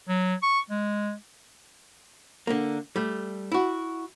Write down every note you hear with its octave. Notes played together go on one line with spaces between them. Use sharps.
F#3
C#6
G#3
D3 A#3
G3 A3
E4 F#4